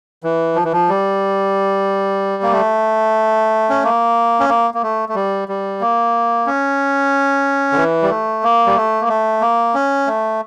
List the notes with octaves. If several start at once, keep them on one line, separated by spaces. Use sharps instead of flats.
E3
F3
E3
F3
G3
A#3
A3
C#4
A#3
C#4
A#3
A#3
A3
A3
G3
G3
A#3
C#4
D3
E3
G3
A3
A#3
G3
A3
A#3
A3
A#3
C#4
A3